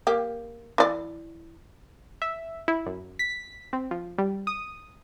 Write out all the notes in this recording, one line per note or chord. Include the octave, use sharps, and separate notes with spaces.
A#3 G4
E3 D5
E5
E4
F#2
B6
C4
F3
G3
D#6